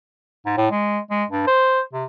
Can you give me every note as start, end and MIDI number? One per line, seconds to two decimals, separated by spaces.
0.46 0.54 44
0.57 0.68 45
0.71 0.99 56
1.10 1.24 56
1.30 1.47 43
1.47 1.81 72
1.93 2.05 48